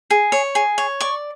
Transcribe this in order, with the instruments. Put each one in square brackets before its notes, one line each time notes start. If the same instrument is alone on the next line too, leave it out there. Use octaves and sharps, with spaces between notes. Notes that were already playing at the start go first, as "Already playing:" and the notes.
[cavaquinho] G#4
C#5
G#4
C#5
D5 C#6